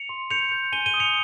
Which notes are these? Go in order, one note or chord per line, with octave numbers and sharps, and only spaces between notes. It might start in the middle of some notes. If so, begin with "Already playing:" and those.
Already playing: C#7 F7
C6
G6 C#7 F7
G6
G#5 D#7 G7
D#7 G7
D#6
C#7 F7